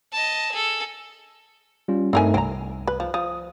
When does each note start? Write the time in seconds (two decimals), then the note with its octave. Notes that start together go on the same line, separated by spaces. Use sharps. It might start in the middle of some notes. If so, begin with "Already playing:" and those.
0.13 D#5 A5
0.52 G#4 A4
1.88 G3 C#4 F4
2.13 G2 A3 C4 D#4 A#4 G#5
2.34 C2 C4 A#5
2.88 B4
3.00 F3
3.14 F3 D#6